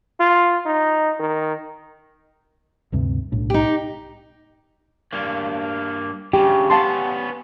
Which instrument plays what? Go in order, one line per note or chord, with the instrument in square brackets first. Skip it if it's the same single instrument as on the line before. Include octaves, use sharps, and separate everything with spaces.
[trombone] F4
D#4
D#3
[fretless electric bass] D2 G2 C3
B1 A2 D4
[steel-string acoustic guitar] D#4 G4
[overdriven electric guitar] G2 A#3
[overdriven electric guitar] G2 C#3 [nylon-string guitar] G4
[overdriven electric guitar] B3 C#4 [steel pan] F5 A5 C6